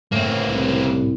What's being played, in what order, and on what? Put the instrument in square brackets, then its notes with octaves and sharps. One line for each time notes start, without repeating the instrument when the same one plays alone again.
[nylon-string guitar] A2 C#3 [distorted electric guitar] A#3 C4
[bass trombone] C2